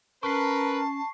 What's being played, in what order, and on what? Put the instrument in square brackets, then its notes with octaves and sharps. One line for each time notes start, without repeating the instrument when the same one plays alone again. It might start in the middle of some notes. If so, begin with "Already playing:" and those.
[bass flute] C#4 [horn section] A#4 B4 [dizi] A5 [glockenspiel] C#6 C7